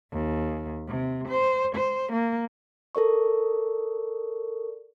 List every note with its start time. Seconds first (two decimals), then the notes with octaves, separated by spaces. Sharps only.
0.13 D#2
0.88 C3
1.28 C5
1.75 C5
2.13 A#3
2.95 A4 A#4 D5 C#6